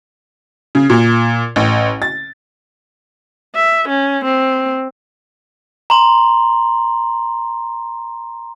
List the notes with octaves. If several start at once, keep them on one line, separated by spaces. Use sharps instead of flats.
C#3
A#2
A1
A6
E5
C#4
C4
A#5 C6